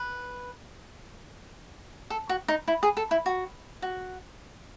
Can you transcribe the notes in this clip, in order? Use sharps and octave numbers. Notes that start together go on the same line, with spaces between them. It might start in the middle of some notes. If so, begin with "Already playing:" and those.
Already playing: B4
A4
F#4
D#4
E4
G#4
A4
E4
F#4
F#4